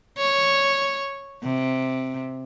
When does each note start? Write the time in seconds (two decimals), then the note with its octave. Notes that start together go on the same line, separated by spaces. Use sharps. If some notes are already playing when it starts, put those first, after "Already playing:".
0.18 C#5
1.43 C3